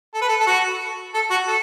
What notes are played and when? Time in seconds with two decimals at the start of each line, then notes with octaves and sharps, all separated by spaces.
0.14 A4
0.22 B4
0.29 A4
0.40 A4
0.47 F#4
1.14 A4
1.31 F#4
1.47 A4